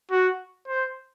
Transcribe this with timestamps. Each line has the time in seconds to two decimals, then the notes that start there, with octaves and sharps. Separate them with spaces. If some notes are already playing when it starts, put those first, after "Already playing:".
0.11 F#4
0.68 C5